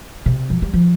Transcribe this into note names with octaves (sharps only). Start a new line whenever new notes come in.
C3
F3
G3
F3